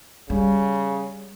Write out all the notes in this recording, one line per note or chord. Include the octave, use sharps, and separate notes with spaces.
C#3 G3